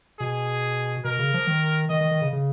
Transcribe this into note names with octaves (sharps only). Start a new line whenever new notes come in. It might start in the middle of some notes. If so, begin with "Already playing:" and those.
B2 G#4
B2 A#4
C#3
F3
D#3
D#3 D#5
D#3
D#3
C#3
C#3